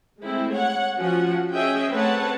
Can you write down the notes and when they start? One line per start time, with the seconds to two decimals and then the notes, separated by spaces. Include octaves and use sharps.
0.21 G#3 A3 C4 E4
0.55 C#5 F#5
0.98 F3 C#4 F#4 F#5
1.54 C#4 G#4 D#5 E5 G5
1.92 A3 C4 B4 C#5 F#5 A5